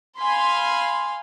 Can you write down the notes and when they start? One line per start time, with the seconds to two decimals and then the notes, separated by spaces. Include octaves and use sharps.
0.18 F5 G#5 B5 C6